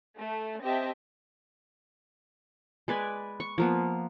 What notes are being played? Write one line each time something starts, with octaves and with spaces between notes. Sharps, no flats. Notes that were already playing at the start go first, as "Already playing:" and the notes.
A3
C4 G4 D#5 E5 G5 A5
G#3 B4 D5 G#5
C#6
F3 A#3 B3